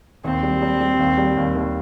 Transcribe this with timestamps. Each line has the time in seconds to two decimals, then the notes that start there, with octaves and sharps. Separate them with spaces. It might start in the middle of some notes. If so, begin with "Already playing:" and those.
0.24 D#2 C4
0.43 G3
0.62 G3
0.80 G3
0.99 D#2
1.18 G3
1.37 D#2
1.55 D#2